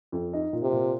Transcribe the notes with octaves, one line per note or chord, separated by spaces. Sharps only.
F2
D#4
A#2
C3
A#2